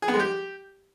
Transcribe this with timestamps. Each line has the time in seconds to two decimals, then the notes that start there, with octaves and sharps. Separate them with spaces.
0.02 G#4
0.08 B3
0.14 G#3
0.19 G4